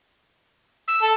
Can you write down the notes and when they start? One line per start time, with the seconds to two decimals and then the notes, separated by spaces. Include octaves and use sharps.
0.88 E6
1.02 A4